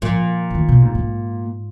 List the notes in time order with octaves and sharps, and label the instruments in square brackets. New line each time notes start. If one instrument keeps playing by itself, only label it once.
[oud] A#2 [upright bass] F3
[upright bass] C#3
D#3
B2
G#2
G#2